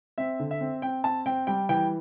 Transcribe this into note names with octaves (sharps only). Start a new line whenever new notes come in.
C4 E5
D3
E5
C4
C4 G5
C4 A5
C4 G5
G3 G5
E3 G5